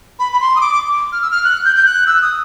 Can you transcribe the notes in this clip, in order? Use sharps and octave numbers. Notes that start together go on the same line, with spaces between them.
B5
B5
C6
D#6
D6
F6
E6
F6
F#6
G6
G6
F#6
E6
D#6